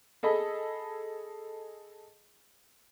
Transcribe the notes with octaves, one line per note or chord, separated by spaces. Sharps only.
G#4 A4 D#5 B5